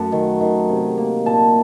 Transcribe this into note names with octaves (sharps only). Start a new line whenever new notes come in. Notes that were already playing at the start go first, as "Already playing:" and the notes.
Already playing: F#2 A3 F#5 A5
D#3
D#3
C3
A#3
A#2 A5